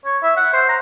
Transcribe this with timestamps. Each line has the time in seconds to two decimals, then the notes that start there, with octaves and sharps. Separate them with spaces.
0.05 C#5
0.23 E5
0.37 F#5
0.53 C5
0.69 A#5